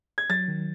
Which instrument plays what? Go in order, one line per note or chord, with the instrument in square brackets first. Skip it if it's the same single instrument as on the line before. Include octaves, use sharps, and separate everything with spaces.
[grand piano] G#6
[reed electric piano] F#3 [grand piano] A6
[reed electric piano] D#3